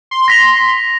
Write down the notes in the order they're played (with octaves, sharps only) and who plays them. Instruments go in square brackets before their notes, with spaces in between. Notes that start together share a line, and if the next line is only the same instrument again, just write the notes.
[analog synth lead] C6
[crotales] A#6 B6 F7